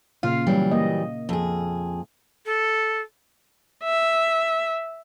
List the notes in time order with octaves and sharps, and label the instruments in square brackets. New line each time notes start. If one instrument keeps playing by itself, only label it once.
[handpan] A#2 C#3 F5 [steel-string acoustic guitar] F4
[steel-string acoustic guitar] E3 F#3 G3
[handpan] A#3 D#5
[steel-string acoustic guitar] F2 G#4
[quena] A4
[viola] E5